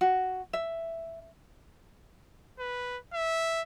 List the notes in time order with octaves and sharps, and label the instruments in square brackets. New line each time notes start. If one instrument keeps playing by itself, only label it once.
[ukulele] F#4
E5
[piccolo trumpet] B4
E5